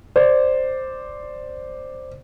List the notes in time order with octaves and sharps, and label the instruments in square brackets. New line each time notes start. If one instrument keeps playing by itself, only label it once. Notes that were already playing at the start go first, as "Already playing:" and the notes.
[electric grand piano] C5 D5